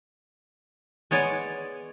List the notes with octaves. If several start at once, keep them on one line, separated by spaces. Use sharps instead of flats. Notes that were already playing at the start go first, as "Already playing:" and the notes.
G#3 B3 C#5 D5 G#5